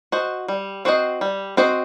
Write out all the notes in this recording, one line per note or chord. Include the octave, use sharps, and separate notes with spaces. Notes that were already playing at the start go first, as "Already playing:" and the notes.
F#4 C5 D#5
G3
C4 F#4 C5 D#5
G3
C4 F#4 C5 D#5